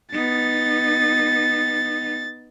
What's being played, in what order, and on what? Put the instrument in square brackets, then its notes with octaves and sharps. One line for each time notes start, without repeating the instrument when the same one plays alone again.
[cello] B3 D#4 [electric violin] A6